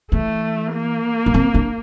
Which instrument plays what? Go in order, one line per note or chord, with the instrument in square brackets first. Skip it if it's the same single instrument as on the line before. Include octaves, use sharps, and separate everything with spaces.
[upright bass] E3 [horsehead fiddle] A3
[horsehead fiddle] A#3
[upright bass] D4
C4
D4